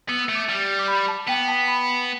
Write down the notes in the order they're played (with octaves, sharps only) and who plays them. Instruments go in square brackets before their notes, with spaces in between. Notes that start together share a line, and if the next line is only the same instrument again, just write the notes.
[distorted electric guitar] B3 [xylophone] E6
[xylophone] E6
[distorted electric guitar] A3
[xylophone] D6
[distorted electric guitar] G3
[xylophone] D6
B5
A5
[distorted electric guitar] B3 [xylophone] G5
[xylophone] A5
B5